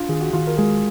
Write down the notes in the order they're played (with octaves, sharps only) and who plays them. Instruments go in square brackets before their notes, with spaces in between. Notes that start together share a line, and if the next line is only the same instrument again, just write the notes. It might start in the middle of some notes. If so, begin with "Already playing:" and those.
Already playing: [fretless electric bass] D4 [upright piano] F4
[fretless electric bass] D#3 [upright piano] G#4
[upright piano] F#4
[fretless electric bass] D#3 [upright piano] F4
[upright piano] A#4
[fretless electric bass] G#3 [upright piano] G#4